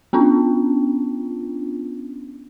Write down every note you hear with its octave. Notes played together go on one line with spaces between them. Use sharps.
B3 C#4 D4 F4